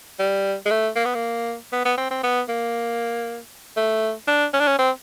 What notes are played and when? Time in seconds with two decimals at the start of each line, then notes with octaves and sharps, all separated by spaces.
0.19 G3
0.66 G#3
0.71 A3
0.96 A#3
1.05 B3
1.15 A#3
1.72 B3
1.85 B3
1.97 C4
2.11 C4
2.23 B3
2.49 A#3
3.77 A3
4.28 D4
4.53 C#4
4.60 D4
4.67 C#4
4.78 C4